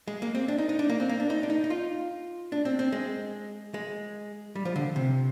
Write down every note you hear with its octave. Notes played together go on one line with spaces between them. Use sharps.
G#3
A#3
C4
D4
D#4
D#4
D4
A#3
C4
A#3
D4
D#4
D4
D#4
D#4
F4
D4
C4
C4
G#3
G#3
G3
F3
D3
C3